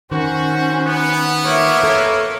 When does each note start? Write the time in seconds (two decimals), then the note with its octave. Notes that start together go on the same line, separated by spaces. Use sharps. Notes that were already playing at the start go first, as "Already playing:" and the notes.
0.11 D#3 C#4 F#4 C5
0.86 B3 F#5
1.45 A#3 C#5 E5
1.83 A4